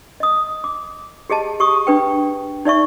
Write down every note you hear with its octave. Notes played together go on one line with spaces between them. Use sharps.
D#5 D#6
D6
G4 G#4 D#5 A5
G4 C#6 D#6
D4 B4 G5
D#4 D5 E5 C#6